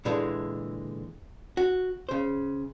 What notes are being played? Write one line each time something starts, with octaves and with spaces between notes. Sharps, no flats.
A#2 D3 E3 G#3
F#4
C#3 C5